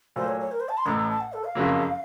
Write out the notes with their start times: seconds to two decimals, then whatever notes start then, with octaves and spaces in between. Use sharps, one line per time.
0.16 A#2 F#3 A3 C5
0.28 C#5
0.40 C#5
0.52 A#4
0.60 C5
0.69 A5
0.77 C6
0.86 A1 A2 A3 A#5
0.98 A#5
1.10 A5
1.20 F#5
1.33 A4
1.44 F5
1.55 F#1 F2 C#3 F#3 A#3